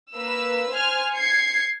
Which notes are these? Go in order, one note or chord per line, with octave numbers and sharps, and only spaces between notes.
A#3 B4 E6
C5 G#5 F6
G#6 C7 C#7